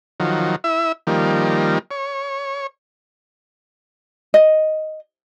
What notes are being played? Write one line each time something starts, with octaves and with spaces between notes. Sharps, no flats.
D#3 F3 F#3
E4 E5
D#3 F3 G3 A#3
C#5
D#5